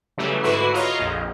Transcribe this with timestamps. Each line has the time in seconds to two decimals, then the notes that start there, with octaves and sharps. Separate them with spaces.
0.18 C#3 E3 F#3 G3 A3
0.43 G#2 D3 E4 F#4 B4 C7
0.74 F4 C#5 D#5 F5 A#5
0.99 A#1 F2